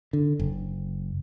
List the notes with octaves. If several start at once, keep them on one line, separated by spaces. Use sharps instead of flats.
D3
F#1